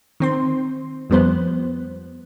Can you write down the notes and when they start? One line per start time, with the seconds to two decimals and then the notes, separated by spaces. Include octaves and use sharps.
0.20 D#3 C4 C6
1.10 F2 F3 G3 B3 C5 F#6